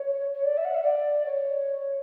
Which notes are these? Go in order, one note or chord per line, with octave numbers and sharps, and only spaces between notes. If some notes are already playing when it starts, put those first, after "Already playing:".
Already playing: C#5
C#5
D5
E5
F#5
E5
D5
C#5